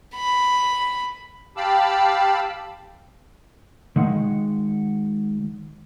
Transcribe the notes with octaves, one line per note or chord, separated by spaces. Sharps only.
B5
G4 F5 A5 B5 D6 E6
D#3 G#3 F#5